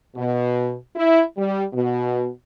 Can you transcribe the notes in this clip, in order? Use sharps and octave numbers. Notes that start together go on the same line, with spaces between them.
B2
E4
G3
B2